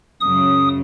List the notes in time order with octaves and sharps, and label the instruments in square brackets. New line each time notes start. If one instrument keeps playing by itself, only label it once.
[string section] C#2 F#2 C#3 [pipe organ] D#6